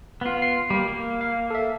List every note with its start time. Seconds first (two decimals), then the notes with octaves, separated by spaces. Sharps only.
0.21 B3 F4
0.42 C7
0.70 G3 A#3
0.88 A#3
1.21 F5
1.50 A4 E5